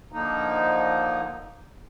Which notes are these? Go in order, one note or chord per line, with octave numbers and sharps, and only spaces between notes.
D3 F3 A#3 D#4